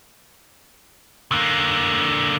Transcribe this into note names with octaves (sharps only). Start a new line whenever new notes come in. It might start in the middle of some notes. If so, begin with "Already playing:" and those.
D3 A#3